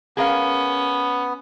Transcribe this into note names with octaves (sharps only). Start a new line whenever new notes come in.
B3 C#4 G#4 A#4 F5